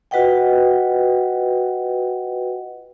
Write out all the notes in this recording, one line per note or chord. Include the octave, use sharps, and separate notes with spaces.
F4 F#4 B4 D#5 F#5 G5